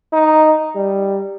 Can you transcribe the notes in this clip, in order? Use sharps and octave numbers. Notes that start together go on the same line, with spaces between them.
D#4
G3